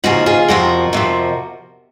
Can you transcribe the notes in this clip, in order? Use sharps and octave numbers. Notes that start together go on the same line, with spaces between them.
D#2 C#3 F3 D#4 F#4
F4 G#4
F2 C3 F3 F#4 A#4
F2 C3 F3